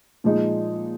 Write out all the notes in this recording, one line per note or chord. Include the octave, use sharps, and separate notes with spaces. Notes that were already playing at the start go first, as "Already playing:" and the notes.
A#2 F3 G#3 D#4